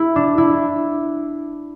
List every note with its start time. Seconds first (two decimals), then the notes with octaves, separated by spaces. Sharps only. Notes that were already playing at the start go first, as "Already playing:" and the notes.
Already playing: E4
0.16 D4
0.38 E4